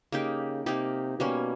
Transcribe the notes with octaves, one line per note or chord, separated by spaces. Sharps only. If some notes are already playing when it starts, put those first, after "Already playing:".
C#3 A#3 D#4 G4
C3 A#3 D#4 G4
B2 G3 A#3 C#4